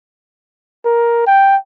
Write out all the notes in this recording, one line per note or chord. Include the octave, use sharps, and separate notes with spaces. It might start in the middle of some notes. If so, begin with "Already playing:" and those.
A#4
G5